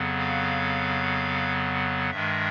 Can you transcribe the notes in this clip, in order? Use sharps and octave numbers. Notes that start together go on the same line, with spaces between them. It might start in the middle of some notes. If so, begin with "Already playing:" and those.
Already playing: F2 C#3 F#3 B3
F5
G2 D#3 G#3 E5